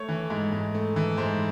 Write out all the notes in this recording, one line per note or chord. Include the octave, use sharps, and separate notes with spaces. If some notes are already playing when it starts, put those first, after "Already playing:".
Already playing: A3 C#5
E3
G#2
G#2
A3
E3
G#2 C5